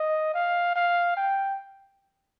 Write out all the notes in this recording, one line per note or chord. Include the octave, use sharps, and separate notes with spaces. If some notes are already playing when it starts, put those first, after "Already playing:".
Already playing: D#5
F5
F5
G5